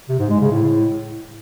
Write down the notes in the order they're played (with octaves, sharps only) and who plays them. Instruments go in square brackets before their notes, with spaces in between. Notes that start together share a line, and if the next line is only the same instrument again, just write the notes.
[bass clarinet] C3
G#2
G#3
C#3
A2